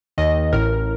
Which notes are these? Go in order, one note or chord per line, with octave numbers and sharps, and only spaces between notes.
D#2 D#3 D#5
A1 A2 A#4